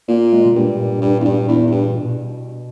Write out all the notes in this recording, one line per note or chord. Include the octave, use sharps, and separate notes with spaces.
A#2 A#3
G#3
B2
G2 A#2
A#2
G2
E2
G2
E2
E2
G2
B2